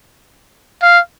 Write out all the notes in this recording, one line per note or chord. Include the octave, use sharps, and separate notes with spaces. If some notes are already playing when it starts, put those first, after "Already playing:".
F5